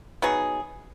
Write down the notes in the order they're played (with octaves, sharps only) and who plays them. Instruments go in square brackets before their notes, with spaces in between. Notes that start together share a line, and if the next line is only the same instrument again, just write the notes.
[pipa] F#3 B3 D#4 G#4